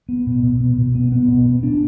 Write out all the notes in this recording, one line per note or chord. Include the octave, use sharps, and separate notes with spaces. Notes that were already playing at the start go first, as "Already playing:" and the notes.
B3
B2
B2
B3
B2
B3
B3
B2
B3
D4